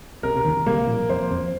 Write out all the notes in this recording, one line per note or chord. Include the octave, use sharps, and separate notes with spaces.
C2 C3 A#4
C3
D#2 D#3
C2 C3 A#3
A#1 A#2
F2 C5
F2